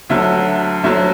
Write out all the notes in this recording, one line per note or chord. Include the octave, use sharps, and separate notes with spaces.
D2 D3 F#3 E5
D2 D3 F#3 E5